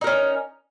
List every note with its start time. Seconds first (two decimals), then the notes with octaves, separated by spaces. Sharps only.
0.01 D#4
0.04 A#4
0.07 C#4